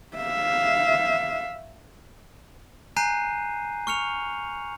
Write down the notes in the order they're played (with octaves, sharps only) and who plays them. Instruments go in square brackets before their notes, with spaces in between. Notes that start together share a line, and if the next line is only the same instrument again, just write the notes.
[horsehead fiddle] E5 F5
[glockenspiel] G#5 A#5 F#6 G6 C7 D#7
C#6 F6 C#7 F7